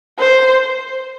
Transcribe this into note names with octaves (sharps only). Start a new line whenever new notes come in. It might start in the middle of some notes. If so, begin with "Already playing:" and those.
C5